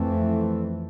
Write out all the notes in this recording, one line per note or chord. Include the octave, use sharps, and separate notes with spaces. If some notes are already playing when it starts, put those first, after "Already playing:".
Already playing: F2 E3 A3 C4